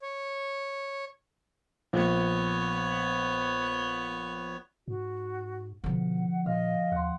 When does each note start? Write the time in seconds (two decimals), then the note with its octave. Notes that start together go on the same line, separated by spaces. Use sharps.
0.02 C#5
1.93 A#1 B3 C#5
4.88 G#2 F#4
5.84 B2 D3 F3 F#5
6.46 A#2 D#5 F5
6.92 D#2 F#5 C6